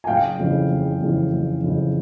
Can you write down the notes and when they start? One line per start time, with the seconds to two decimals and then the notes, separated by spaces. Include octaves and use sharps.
0.04 G#5
0.07 F#1 F5 G5
0.39 F2 C#3 E3
0.70 F#1
1.01 F2 C#3 E3
1.32 F#1
1.64 F2 C#3 E3